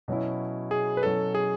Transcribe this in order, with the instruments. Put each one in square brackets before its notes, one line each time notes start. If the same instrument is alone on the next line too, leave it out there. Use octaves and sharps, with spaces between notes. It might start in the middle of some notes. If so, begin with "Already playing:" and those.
[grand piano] B2 F#3 C#4 E4
[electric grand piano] G#4
B4
[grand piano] B2 F#3 C#4 E4 [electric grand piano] A4
[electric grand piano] G#4